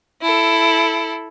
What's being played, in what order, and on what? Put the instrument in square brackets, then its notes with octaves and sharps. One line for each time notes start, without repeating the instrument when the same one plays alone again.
[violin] E4 A4